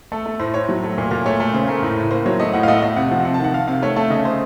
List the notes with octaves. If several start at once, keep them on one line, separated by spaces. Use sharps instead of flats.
A3 A4
A3
A2 C5
A2 C#5
F#3
A3
A#2
A#2
A3 C#5
A3
C#3 C5
A3 A#4
A2
A2
A#3 C5
F#3 C#5
A3 D#5
A2 F#5
F5
A3 D#5
A3 D#5
C3 F#5
F3
C3 F#5
A5
D#3 F#5
D#3 F5
C3 F5
A3 C#5
A3 A4
C#3 D#5
A3 C5